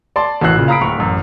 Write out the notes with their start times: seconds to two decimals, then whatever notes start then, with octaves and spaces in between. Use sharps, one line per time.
0.16 D5 A5 C6
0.41 A1 E3 F#4 E6 F#6 C7
0.56 A#2 C#3
0.68 F5 A#5 B5 D#6 B6 D7
0.81 D1 C#6 F7
0.99 A1 F#2